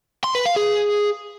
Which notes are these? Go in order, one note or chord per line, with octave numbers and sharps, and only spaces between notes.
C6
B4
F5
G#4